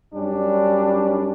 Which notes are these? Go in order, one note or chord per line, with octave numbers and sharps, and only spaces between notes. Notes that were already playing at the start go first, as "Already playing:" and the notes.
F#2 G3 C#4 D4